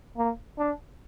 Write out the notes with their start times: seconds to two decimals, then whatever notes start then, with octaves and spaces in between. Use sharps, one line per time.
0.18 A#3
0.58 D4